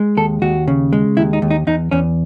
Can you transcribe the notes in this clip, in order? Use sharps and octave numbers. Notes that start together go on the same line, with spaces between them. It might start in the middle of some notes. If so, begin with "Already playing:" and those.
Already playing: G#3
D#2 A4
D#2 F#4
C#3
G#3
D#2 E4
D#4
D#2
D#4
E2 D#4
E2 C#4